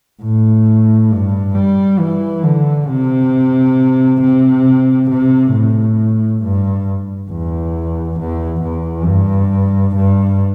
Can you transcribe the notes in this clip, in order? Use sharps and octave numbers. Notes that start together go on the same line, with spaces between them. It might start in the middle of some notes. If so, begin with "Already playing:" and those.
A2
G2
G3
E3
D3
C3
C3
C3
A2
G2
E2
E2
E2
G2
G2